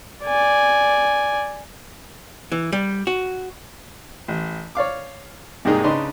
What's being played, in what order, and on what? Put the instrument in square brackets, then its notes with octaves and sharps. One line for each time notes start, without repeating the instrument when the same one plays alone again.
[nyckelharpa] D5 G#5
[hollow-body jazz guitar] E3
G3
F#4
[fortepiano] A1
C#5 D5 F5 D6
C2 G#2 G#3 A#3 D#4 G#4
C#3 D4 D#4 B4 C6